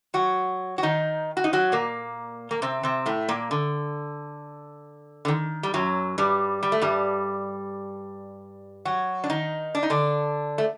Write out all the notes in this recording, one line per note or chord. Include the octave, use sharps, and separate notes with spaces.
F#3 F#4
F#4
D#3 D#4
F#4
D#4
F#3 F#4
A#2 A#3
A#3
C3 C4
C3 C4
A2 A3
A#2 A#3
D3
D3
D#3
G3
F#2 F#3
G2 G3
G3
A3
G2 G3
F#3 F#4
D4
D#3 D#4
D4
D#4
D3 D4
A3